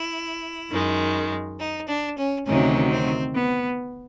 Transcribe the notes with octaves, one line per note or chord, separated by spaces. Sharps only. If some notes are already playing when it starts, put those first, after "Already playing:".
Already playing: E4
F#2 D#3 G#3
D#4
D4
C#4
D2 C3 D#3 F#3 C#4
C4
B3